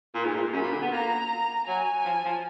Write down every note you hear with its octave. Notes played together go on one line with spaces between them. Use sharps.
A#2
G#2
A#2
F#2 B5
A#2
D3
B3
A#3 A#5
F#3 G#5
F3
F3